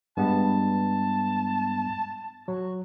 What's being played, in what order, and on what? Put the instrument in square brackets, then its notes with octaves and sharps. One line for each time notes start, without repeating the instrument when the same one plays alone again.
[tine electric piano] G2 G#3 B3 [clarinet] A5
[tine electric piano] F#3 [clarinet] F#4